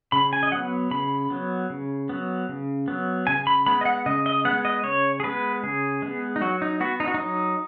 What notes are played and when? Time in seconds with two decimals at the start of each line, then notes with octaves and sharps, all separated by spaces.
0.12 C#3 B5
0.33 G#5
0.43 D#5
0.52 F#3 B3 F#5
0.91 C#3 B5
1.30 F#3 B3
1.70 C#3
2.09 F#3 B3
2.49 C#3
2.88 F#3 B3
3.27 C#3 G#5
3.47 B5
3.66 G#3 B3 B5
3.81 D#5
3.85 F#5
4.06 C#3 D#5
4.26 D#5
4.45 G#3 B3 F#5
4.65 D#5
4.84 C#3 C#5
5.20 G#4
5.24 G#3 B3 B4
5.63 C#3 G#4
6.02 G#3 B3
6.36 D#4
6.41 F#3 F#4
6.62 D#4
6.80 B3 F#4
7.00 D#4
7.07 F#4
7.14 F#3 D#4